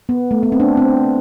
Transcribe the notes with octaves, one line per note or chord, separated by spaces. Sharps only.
B3
A3
B3
C4
D4
C4